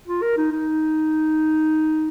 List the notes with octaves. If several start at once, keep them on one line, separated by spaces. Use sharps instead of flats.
F4
A#4
D#4
D#4